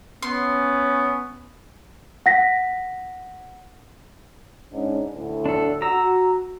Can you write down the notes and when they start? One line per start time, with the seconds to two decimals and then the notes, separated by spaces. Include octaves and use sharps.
0.22 B3 C#4 C6
2.26 F#5 A#6 B6
4.73 G#2 C#4 D4
5.13 D2 A2
5.46 D4 A4
5.82 F#4 A#5 E6